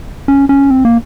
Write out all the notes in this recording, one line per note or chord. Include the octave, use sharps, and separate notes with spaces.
C#4
C#4
C4
A#3